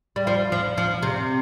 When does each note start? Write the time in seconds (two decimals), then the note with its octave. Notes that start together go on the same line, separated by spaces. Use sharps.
0.16 G3
0.27 F3
0.52 F3
0.78 F3
1.03 C3